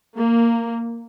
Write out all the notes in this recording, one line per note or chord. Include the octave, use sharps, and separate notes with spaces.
A#3